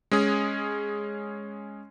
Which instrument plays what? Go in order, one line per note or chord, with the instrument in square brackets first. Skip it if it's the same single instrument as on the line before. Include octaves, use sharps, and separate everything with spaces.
[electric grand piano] G#3 C#4 G#4